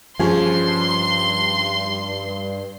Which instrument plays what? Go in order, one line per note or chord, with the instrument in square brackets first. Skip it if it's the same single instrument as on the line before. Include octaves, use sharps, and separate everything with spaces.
[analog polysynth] G2 [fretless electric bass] F3 [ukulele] C#4 G#4 [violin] C6